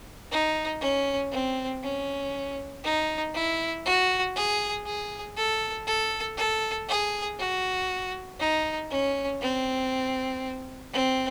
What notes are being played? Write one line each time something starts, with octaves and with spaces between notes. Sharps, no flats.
D#4
C#4
C4
C#4
D#4
E4
F#4
G#4
G#4
A4
A4
A4
G#4
F#4
D#4
C#4
C4
C4